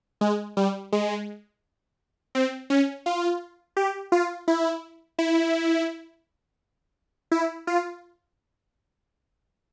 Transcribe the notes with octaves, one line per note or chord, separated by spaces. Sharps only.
G#3
G3
G#3
C4
C#4
F4
G4
F4
E4
E4
E4
F4